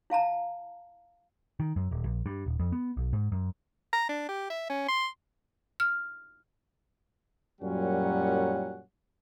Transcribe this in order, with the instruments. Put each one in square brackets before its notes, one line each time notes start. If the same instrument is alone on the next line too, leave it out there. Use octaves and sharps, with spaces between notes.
[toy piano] E4 F5 A5 A#5
[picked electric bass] D#3
F#2
D#1
A#1
G2
D#1
F2
B3
B1
G#2
F#2
[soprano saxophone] A#5
D4
G4
E5
C#4
C6
[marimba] F6
[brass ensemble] F#2 A#2 F#3 G3 C#4 F#5